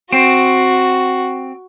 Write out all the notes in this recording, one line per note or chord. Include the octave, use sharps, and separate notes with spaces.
C4 F#4